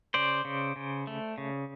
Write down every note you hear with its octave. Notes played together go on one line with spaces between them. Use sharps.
C#3 C5 D5
C#3
C#3
A3
C#3